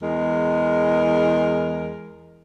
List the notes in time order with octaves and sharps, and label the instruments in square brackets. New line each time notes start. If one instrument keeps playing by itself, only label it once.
[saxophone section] E2 G#3 A#4